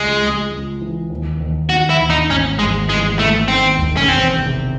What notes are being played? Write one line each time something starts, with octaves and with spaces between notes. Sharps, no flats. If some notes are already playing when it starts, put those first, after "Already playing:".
Already playing: C#2 G#3
C#2
C#2
E3
D#2
D#2
D#3 F#4
E4
D#2
D#4
G#1 C#4
G#1 G#3
E3 G#3
E3 A3
D#3 C4
E1
C#4
E2 C4
C3